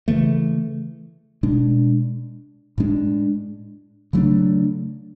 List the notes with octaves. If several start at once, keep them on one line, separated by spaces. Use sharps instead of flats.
C#3 E3 A3
B2 G#3 D4
A2 G#3 D4
C#3 F#3 A3 D4